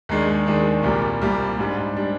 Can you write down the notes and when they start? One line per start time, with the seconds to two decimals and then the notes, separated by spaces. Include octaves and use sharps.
0.09 D#2 D#3 G#3 D4
0.47 D#2 D#3 G#3 D4
0.83 C2 A#2 G3
1.21 C2 A#2 G3
1.59 G#2 G3 D4
1.97 G3 D4